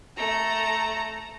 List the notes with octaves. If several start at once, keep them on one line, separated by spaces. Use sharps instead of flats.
A3 A#5